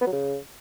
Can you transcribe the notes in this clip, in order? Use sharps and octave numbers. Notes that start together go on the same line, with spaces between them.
B3
F#3
C#3